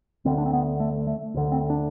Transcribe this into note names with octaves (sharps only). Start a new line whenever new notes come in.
D2 D3 C4
D4
C4
B3
A3
A3
D2 D3
C4
D4